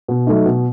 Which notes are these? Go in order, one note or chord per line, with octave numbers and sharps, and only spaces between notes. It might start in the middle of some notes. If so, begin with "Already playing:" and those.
B2
F#3 A3 D#4
B2